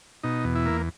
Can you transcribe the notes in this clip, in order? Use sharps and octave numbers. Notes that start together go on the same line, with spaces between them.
B2 D#4
E2
E4
A#3